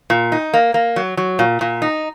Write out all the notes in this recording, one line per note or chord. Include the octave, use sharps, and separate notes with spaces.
A#2
D#4
A#3
A#3
F#3
F#3
A#2
A#2
D#4